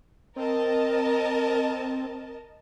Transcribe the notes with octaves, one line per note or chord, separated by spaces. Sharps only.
C4 A#4 D#5 A5